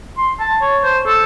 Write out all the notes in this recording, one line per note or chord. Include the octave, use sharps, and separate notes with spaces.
C6
A5
C#5
C5
A4